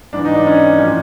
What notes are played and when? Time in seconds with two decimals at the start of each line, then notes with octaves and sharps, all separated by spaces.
0.13 G#2 E3 D4
0.25 D#4
0.35 D4
0.46 C#4
0.78 A2 F3 C#4